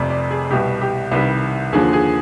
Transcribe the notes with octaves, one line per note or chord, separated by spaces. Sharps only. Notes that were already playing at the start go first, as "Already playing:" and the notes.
Already playing: F1 F2 C3 D5
D5
G#4
C2 B2 G3 G4
G4
C2 C3 D#3 G3 B4
D#2 D3 F3 G#4
G#4